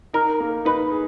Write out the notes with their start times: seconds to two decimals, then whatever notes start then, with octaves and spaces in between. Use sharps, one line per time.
0.13 D#4 A#4
0.40 A#3
0.65 D#4 B4
0.91 G#4